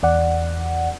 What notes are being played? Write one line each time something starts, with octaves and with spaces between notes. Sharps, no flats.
E2 D5 F#5